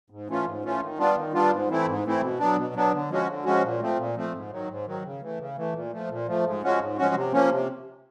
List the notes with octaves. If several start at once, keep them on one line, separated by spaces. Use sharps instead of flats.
G#2
E3 A3 C#4 F4
G#2
E3 A3 C#4 F4
D#3
G3 B3 D4 F4
D#3
G3 B3 D4 F4
G#2
E3 A3 C4 E4
G#2
E3 A3 C4 E4
B2
F#3 B3 D4
B2
F#3 B3 D4
D3
F3 G#3 C#4 F#4
D3
F3 G#3 C#4 F#4
A#2
F3 A3 C4
A#2
F3 A3 C4
G#2
D#3 F#3
G#2
D#3 F#3
C#3
E3 A3
C#3
E3 A3
A#2
F3 A3
A#2
F3 A3
G#2
F3 G#3 C#4 F#4
G#2
F3 G#3 C#4 F#4
C3
F3 A#3 C#4
C3